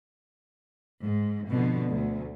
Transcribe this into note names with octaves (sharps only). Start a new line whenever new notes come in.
G#2
F2 B2 D3
D2